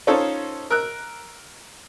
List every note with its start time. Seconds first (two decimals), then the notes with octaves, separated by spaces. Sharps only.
0.07 C#4 D#4 F4 A4 C5 C#5
0.70 A#4 E6 F#6